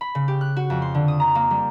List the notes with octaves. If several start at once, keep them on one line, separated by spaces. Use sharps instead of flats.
B5
C#3
G4
F#6
F#4
F2
C6
D3
D#6
A#5
A#3
G3